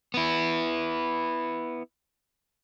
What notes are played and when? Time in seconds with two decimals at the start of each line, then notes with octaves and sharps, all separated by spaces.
0.14 B3 E4